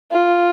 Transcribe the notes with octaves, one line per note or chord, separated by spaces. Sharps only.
F4